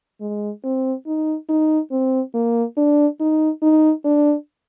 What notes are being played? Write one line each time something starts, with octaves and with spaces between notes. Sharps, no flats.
G#3
C4
D#4
D#4
C4
A#3
D4
D#4
D#4
D4